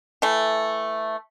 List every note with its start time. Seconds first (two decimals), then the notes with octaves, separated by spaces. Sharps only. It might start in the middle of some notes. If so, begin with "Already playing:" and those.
0.22 E3 A3